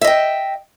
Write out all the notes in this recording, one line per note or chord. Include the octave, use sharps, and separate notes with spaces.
D#5 E5 G5